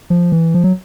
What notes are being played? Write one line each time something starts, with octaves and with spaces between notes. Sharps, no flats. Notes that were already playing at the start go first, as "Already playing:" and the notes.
F3
E3
F3
F#3